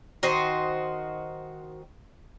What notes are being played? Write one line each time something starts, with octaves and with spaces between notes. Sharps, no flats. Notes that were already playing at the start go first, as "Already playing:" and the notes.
D#3 F#4 C5 D#5